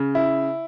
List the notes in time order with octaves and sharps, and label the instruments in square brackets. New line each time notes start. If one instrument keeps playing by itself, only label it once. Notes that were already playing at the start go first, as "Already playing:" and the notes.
Already playing: [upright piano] C#3
E4